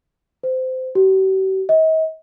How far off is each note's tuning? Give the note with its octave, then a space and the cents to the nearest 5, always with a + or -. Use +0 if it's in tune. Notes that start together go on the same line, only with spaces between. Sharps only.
C5 -20
G4 -45
D#5 +40